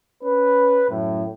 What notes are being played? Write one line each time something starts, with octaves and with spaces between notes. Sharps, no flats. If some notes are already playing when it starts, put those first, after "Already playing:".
C#4 B4
F#2 A2